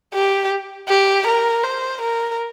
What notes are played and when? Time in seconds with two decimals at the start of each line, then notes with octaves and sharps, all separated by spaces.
0.14 G4
0.89 G4
1.27 A#4
1.64 C5
2.02 A#4